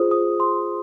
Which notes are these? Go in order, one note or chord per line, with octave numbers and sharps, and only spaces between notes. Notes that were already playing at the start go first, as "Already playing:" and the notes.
Already playing: F4 G#4 C5 D#6
D#6
C6